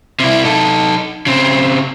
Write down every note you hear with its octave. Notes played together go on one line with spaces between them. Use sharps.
C3 E4
D#4 A4
C#3 C4